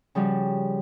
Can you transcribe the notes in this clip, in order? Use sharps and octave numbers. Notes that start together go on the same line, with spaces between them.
C#3 F3 G3 F#4